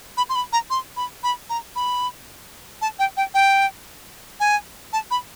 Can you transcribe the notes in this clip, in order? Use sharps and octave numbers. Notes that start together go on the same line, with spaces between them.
B5
C6
B5
A#5
C6
B5
B5
A#5
B5
A5
G5
G5
G5
G#5
A5
B5